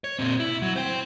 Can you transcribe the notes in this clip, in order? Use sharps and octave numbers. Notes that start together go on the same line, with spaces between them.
C#5
A#2 C4
E4
F#3
C5 G5